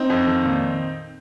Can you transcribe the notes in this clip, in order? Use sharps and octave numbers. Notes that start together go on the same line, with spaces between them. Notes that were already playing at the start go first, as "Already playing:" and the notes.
Already playing: C4 D#4
F2
D#3
A#2